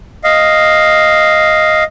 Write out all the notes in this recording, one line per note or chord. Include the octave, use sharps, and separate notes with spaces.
D#5 F5